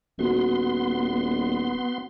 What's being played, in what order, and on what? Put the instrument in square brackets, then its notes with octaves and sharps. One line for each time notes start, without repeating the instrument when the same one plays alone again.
[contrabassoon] D#1 [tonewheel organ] B3 C6 [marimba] F#4